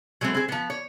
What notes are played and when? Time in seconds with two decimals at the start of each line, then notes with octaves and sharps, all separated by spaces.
0.21 F#3 G#3 A3 B3 C4
0.34 C4 G#4
0.48 F3 B3
0.70 C#5